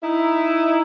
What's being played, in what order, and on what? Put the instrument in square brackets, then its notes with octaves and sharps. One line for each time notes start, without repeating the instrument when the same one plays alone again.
[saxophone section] D#4 E4